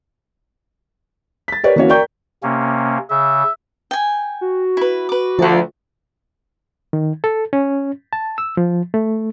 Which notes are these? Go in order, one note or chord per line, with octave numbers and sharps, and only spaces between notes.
A6 B6
G4 A#4 B4 C#5 D5
E3 A#3 C#4 F#4 A#4 C#5
A#4 D5 G5 A#5 C#6 G6
C3 A#3 C#4
C#3 E5
G5 G#5
F#4
E4 B4
B4 D6
D2 F3 D5 F#5
D#3
A4
C#4
A5
E6
F3
A3